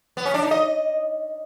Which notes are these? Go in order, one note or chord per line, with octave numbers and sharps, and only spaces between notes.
B3
C#4
D4
D#4
D#5